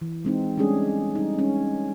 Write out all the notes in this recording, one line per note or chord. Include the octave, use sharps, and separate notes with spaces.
E3
G#3 C4 D#4
G3 G#3 C#4 D4 G#4 A4
G3 D#4
G#3 C#4